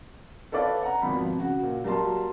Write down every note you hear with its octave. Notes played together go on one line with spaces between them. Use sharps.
A4 B4 C#5 D5 F5
F#5 A#5
G#1 B2 F3 C4 B5
C#3 F#4
A#2
F#3 G3 A#3 A5 C6